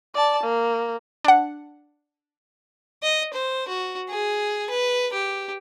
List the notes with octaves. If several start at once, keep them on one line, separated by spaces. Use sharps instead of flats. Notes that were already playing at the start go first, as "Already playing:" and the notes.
D5 A5
A#3
D4 F#5
D#5
C5
F#4
G#4
B4
G4